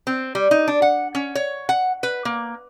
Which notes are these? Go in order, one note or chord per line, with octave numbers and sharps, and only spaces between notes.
C4
G3
D#4
D4
F#5
C#4
C#5
F#5
B4
A#3